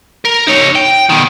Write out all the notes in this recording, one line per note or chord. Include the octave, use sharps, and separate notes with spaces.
A#4
D#4 C#5
G5
B2 D#3